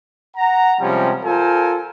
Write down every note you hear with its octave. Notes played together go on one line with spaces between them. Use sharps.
F#5 A#5
C3 F3 G3 G#3 C#4
F4 A4 A#4 C5 G#5